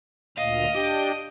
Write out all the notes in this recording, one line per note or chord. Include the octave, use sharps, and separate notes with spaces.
D2 A#2 D#5 F5
D4 G4 G5